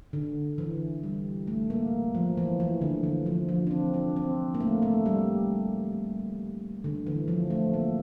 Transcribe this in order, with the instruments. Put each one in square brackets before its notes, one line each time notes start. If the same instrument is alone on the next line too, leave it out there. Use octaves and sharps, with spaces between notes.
[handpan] D3
E3
G3
A3
A#3
F3
E3
E3
D3
E3
F3
F3
D4
C4
D4
C4
A#3
A3
A3
G3
D3
E3
F3
A3
A#3